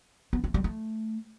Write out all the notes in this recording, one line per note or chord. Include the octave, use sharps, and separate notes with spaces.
B3
A3
G3
A3